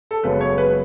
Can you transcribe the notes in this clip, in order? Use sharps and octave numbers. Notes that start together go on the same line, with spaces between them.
A4
F#1 F#2 C#3 G#3 B3 B4
C#5
B4